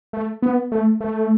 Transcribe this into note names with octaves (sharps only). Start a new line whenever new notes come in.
A3
B3
A3
A3